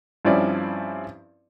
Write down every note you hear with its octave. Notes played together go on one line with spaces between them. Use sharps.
G2 F3 C4 C#4 E4 D5